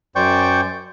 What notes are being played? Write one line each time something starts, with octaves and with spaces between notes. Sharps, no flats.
F#2 C5 D5 G5 C#6 G6